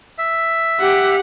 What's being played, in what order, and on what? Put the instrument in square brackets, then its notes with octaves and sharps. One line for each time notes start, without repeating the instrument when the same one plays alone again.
[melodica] E5
[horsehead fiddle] G4 [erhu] F#5